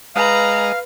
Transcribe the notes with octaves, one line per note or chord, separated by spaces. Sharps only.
G#3 B4 D#5 F5 A#5